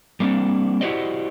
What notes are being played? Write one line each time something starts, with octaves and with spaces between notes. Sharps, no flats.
G3 A#3 C4 D4
E4 F#4 G4 C5 D5 D#5